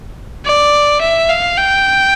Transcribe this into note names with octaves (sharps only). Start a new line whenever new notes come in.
D5
E5
F5
G5